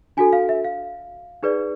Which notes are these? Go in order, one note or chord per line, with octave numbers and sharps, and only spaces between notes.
D4 F#4 A4 G#5
F5
E5
F5
D#4 G#4 B4 D5